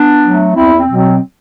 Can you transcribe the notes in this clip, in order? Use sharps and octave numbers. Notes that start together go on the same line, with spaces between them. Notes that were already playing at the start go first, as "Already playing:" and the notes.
Already playing: B3 D4
F#3 A3
E2 C4 E4
C4
B2 F#3
C4